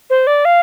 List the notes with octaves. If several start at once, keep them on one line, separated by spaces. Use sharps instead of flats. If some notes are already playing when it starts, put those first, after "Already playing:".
C5
D5
F5